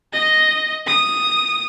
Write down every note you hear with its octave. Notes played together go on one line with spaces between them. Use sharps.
D#5
D#6